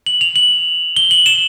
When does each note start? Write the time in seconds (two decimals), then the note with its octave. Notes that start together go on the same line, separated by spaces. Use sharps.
0.06 F#7
0.21 F7
0.36 F#7
0.96 G7
1.11 F#7
1.26 E7